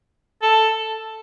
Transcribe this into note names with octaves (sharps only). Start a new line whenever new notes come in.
A4